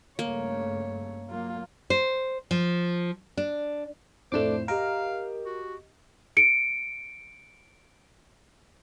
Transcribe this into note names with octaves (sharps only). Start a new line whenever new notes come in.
G2 C#3 A3 A#3 C#5
F#3 A#3 F4
C5
F3
D4
F2 A2 A3 D4 C5 D6 E7
G4 A#4 D#5 F5 D7
F#4
C#7 D7